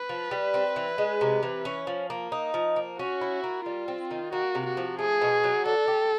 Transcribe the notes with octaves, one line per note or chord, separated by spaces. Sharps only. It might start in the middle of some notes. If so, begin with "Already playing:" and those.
Already playing: B4
F3
G3
C4
E3
G#3
C3
E3
C#4
F3
A#3
D#4
F3
A#3
C#4 F#4
E4
A#3
G3 F4
C4
D#3
A#3 F#4
C3
F#4
F3
A3 G#4
B2
F#3
D4 A4
G4